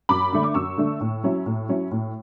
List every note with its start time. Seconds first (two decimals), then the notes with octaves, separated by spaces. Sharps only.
0.09 F#2 B5 D6
0.32 D3 A3 D4
0.43 D6
0.54 F#2 C#6 E6
0.77 D3 A3 D4
1.01 A2
1.24 F#3 C#4 E4
1.46 A2
1.69 F#3 C#4 E4
1.91 A2